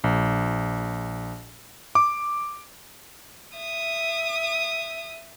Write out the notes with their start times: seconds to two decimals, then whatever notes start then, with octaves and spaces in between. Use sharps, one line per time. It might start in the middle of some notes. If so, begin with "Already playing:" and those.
0.04 A#1
1.95 D6
3.57 E5 D#6